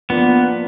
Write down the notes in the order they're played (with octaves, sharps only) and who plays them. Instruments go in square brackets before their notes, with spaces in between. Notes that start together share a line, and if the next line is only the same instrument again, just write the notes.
[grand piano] F3 A#3 D4 F4 [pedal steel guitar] B3